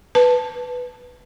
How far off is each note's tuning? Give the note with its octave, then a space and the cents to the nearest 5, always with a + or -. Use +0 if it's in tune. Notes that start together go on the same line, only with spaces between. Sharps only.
B4 +0 A5 +0